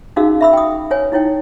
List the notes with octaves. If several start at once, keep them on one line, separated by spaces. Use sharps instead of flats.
C#4 D#4 F#4 G#4 F5 E6
E5 B5 E6
G5 D#6
B4 C#5 G#5
D#4 E4 C#5 G5